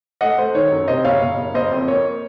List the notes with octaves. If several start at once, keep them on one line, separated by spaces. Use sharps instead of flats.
A3 D#5 F#5
A3 C5
D#3 C#5
F#2
C3 C5 D#5
F#1 C#5 F5
F#1
F#1
F#1 C5 D#5
F2
A#3 C#5